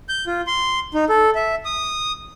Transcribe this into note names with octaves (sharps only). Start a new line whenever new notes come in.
G6
F4
C6
D#4
A4
E5
D#6